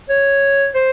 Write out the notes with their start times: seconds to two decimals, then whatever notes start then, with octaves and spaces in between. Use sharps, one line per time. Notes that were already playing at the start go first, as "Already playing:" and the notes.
0.09 C#5
0.74 C5